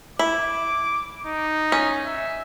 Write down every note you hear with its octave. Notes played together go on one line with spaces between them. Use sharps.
E4 D6
D#4
C#4
E5